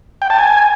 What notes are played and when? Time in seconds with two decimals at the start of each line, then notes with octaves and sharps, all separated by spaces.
0.22 G5
0.30 A5
0.38 G#5